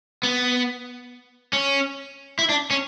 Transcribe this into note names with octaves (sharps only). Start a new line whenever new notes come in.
B3
C#4
E4
D4
C#4